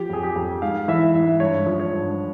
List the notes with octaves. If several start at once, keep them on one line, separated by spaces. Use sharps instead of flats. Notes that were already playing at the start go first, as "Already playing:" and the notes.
Already playing: F3 G4
F2 G#4
G4
F2
G#2 F5
E3 E5
G#2 E5
G2 C#5
F3
C#5
G2